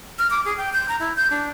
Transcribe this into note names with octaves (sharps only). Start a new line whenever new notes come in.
F6
D6
G#4
G5
G6
A#5
E4
G6
D4